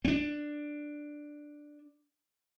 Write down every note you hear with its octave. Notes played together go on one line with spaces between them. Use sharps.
C4 D4